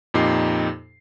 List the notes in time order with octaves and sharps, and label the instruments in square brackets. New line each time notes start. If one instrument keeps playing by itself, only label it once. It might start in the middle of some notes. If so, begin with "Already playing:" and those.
[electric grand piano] F2 A#2 D#4 G4 C7